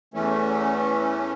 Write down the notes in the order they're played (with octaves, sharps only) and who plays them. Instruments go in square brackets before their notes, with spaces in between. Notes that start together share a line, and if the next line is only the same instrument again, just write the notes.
[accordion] E2 E3 A3 C#4